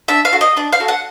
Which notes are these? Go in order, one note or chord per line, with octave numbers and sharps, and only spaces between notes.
D4 E5
F5
F#4 A4
D#5
D4 D5
F5
F#4 A4
F#5